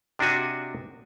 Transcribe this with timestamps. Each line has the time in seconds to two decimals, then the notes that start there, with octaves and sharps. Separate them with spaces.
0.19 C3 D4 D#4 F#4 G#5